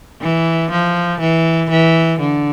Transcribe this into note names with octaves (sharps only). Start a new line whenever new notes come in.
E3
F3
E3
E3
D3